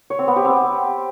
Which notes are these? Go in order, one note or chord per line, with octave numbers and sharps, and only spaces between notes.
C#5
C4
B3
G4
C4